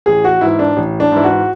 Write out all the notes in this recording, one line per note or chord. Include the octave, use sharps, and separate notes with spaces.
A1 G#4
F#4
G#2 E3 E4
D4
A1
D4
G#2 E3 E4
F#4